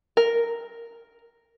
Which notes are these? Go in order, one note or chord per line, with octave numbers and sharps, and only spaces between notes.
A#4